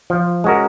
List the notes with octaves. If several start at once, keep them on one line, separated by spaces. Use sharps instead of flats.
F3
G#3 C#4 F#4 A#4